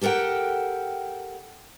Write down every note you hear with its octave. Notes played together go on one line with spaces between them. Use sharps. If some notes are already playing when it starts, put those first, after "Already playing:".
G4 A4 A#4 F#5 G5